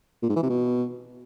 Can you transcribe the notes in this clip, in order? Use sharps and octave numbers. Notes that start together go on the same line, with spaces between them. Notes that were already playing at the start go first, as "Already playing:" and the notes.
A#2
G#2
E3
C3
B2